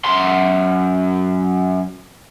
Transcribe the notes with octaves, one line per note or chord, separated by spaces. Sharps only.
F#2 C6